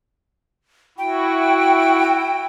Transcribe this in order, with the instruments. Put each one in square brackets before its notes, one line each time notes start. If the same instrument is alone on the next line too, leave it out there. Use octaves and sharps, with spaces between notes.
[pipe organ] E4 F#4 [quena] G5